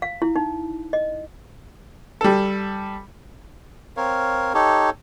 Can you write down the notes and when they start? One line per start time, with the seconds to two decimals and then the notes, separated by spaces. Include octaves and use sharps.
0.02 F5
0.22 E4
0.36 D#4
0.93 D#5
2.21 G3 A4
3.97 C4 A#4 C#5 F5
4.54 D#4 G4 A4 C#5